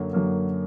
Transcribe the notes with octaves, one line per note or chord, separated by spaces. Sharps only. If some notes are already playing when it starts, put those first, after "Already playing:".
Already playing: F#2 D3 F#3 A#3
F#2 D3 F#3 A#3